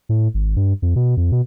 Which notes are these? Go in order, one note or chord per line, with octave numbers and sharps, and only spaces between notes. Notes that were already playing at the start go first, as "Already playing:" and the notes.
A2
G#1
G2
F2
B2
F2
B2